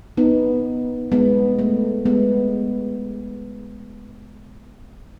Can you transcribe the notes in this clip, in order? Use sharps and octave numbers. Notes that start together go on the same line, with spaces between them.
B3 D#4
G#3 B3
A3
G#3 B3